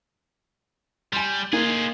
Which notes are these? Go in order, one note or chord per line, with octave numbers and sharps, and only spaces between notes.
G3 G#5 C6
A#3 D#4 F4 G#4